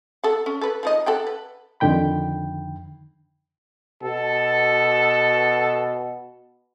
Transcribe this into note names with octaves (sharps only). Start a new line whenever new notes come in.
A4 F#5
C#4
A4 B4
F3 D#4 D#5
A4 F#5 G5
B4
F2 D3 D#3 G5 B5
B2 A4